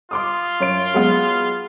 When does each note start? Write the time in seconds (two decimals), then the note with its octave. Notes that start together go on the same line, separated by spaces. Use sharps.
0.11 F4 C6 D6 D#6
0.60 F#2 C#5 D7
0.94 F#3 G#3 B3